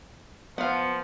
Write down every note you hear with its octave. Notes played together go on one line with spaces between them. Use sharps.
F3 B3 F5 F#5